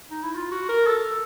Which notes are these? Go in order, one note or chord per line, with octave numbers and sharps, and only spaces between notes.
D#4
E4
F4
F#4
A#4
A4